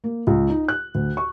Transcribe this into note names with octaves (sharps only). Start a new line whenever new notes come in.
A#3
C#2
D#4
F#6
D2
C#6